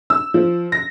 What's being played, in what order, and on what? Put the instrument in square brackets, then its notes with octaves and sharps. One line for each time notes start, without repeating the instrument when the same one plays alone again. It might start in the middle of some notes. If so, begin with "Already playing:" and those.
[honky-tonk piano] E6
F3
A#6